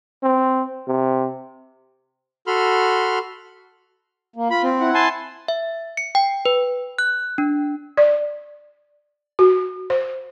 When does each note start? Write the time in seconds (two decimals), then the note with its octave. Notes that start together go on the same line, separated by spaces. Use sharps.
0.23 C4
0.88 C3
2.47 F#4 A4 B5 C6 F6
4.36 A#3
4.50 F4 B5
4.63 C4
4.80 E4 F#5
4.94 G#5 A5 C6
5.48 E5
5.97 C#7
6.15 G5
6.45 B4
6.99 F#6
7.38 D4
7.97 D5
9.39 F#4
9.90 C5